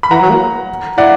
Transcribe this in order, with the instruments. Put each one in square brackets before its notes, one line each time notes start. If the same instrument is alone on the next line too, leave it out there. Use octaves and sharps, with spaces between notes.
[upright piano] B5
[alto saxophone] E3 [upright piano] F#5 A#5
[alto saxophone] F#3
A#3
[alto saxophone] E4 [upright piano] D5 F#5